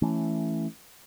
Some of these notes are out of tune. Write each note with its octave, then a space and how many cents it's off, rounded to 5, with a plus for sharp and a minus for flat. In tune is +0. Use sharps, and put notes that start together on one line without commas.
E3 +5 A3 +0 C#4 +0